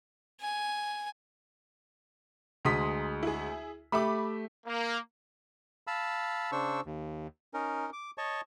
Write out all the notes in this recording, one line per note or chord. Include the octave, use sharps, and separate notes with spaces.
G#5
D2 G#3 A#5 C6 D#6 B6
E4 G#4
A3 G4 E5 B5 D6
A#3
F5 A5 B5 E6
C#3 D4 C5 C#6 E6
D#2
C#4 D#4 A#4
D6
C#5 D#5 A5 C#6